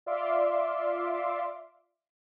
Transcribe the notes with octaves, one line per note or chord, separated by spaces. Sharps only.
F4 D5 E5 F5 C6 D6